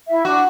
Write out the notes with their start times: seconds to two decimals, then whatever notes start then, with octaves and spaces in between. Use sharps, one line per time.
0.08 E4 E5
0.25 D4 F#4 D5